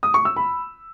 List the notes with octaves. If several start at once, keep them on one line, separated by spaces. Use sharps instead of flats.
D#6
C#6
E6
B5